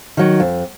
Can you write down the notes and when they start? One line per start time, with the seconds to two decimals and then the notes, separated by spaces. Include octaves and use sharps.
0.17 D#3 F#3
0.40 F2